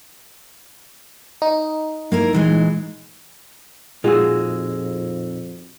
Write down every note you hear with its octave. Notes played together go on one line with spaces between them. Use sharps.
D#4
A#3 E4 A#4
A#2 E3 G#3
F2 A#2 G#3 D#4 F4 F#4 G#4 E6